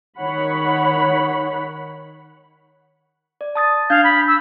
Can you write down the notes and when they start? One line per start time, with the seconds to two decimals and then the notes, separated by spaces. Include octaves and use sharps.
0.19 D#3 C#5 F#5 B5
3.41 D5
3.55 A5 D#6 A6
3.90 D4 F5 G6 G#6
4.04 B5
4.27 E6